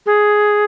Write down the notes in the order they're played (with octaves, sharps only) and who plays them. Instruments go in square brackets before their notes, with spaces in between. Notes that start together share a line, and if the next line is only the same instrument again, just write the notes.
[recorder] G#4